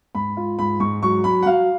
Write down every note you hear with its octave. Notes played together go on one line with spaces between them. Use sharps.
G#2 B5
F4
G#2 B5
G#2 C#6
F#3 C#6
F#3 B5
F#5
F#3 F5